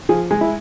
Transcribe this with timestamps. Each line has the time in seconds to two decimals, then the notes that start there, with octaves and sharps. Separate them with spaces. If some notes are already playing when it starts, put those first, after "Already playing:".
0.09 F3 G#4
0.31 G#3
0.41 E4